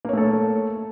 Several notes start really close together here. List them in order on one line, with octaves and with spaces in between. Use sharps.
A#3 C#5 A3 A4